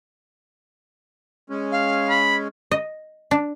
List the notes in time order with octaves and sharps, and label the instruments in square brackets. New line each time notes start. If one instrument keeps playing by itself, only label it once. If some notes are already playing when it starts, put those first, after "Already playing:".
[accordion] G#3 C#4
[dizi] F5
[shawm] B5
[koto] D#5
D4